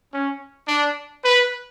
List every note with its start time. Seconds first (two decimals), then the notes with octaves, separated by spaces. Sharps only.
0.13 C#4
0.68 D4
1.24 B4